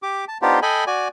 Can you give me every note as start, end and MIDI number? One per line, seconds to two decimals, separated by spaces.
0.03 0.25 67
0.03 0.25 86
0.28 0.38 81
0.42 0.60 59
0.42 0.60 62
0.42 0.60 63
0.42 0.60 65
0.42 0.60 67
0.42 0.60 72
0.62 0.84 69
0.62 0.84 75
0.62 0.84 79
0.62 0.84 80
0.62 0.84 83
0.87 1.08 66
0.87 1.08 74
0.87 1.08 80